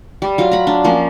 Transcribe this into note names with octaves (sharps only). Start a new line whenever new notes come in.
G3
F#3 F4
A#5 B5
D4
F3 A#3 C#4